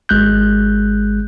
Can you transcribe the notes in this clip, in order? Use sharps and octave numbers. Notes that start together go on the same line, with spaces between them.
G#1 G#3 F#6 G6